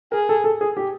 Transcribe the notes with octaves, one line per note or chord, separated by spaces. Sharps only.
G#4 A#4
A4
A4
G#4
G4